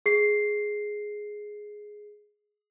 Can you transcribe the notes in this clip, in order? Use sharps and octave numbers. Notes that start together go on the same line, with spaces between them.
G#4 C7